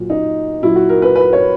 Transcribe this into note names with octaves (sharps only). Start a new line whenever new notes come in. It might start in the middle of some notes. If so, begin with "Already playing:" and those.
Already playing: A#2 F#3
D#4
A#2 F#3 E4
F#4
A#4
B4
B4
C#5